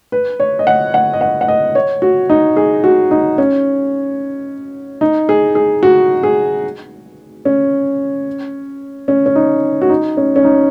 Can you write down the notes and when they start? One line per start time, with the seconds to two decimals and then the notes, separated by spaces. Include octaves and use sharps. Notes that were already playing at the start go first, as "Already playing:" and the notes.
0.12 B4
0.40 C#5
0.59 D#5
0.67 F#5
0.94 F#5
1.13 D#5
1.21 F#5
1.41 F#5
1.48 D#5
1.75 C#5
2.02 F#4
2.29 D#4
2.57 G#4
2.84 F#4
3.11 D#4
3.38 C#4
5.01 D#4
5.29 G#4
5.55 G#4
5.83 F#4
6.23 G#4
7.45 C#4
9.08 C#4
9.26 C#4
9.36 D#4
9.82 F#4
9.90 D#4
10.17 C#4
10.36 C#4
10.44 D#4